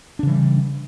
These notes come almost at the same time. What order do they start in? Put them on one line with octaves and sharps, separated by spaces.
D4 C#3 E3 G3